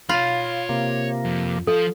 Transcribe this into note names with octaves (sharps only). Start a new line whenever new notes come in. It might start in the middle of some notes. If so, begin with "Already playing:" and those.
F4 C#5 B5
C3 A#3
F2
F3 F4 A4